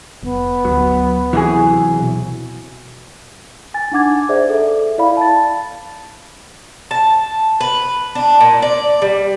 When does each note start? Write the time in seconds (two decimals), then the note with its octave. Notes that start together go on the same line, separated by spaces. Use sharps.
0.23 F1 B3
0.65 D2 F#3
1.33 C3 E3 F#3 E4 F#4 G#4
1.99 B2
3.74 G#5 A6
3.92 D4 D#4 F#5 D6 G#6
4.29 G#4 C5 D5 E5
4.50 A4 E5
4.98 E4 D5 F5 B5
5.17 A5 A6
6.91 A5
7.61 B4
8.15 D4
8.41 A#2
8.62 D5
9.02 G3